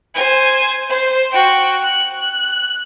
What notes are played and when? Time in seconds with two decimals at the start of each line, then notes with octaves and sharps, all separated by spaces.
0.14 C5 G#5
0.90 C5
1.32 F#4 G5
1.83 F#6